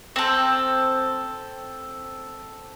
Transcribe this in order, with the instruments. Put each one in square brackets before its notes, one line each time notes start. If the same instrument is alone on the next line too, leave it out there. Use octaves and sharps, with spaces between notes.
[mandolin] C4 A4